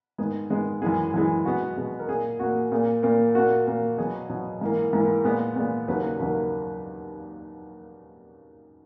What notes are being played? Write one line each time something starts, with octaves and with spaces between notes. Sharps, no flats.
G#2 D#3 G#3 B3 G#4
G#2 D#3 G#3 B3
F#2 E3 G#3 G#4
F#2 E3 G#3
B2 G#3 B3 F#4
B2 G#3 B3
A#4
A#2 A#3 G#4
A#2 A#3 F#4
A#2 A#3 G#4
A#2 A#3
A#2 A#3 F#4
A#2 A#3
B2 F#3 B3 G#4
B2 F#3 B3
G#2 E3 A#3
G#2 E3 A#3
A#2 G#3 B3
A#2 G#3 B3
D#2 C#3 F#3 A#3 B4
D#2 C#3 F#3 A#3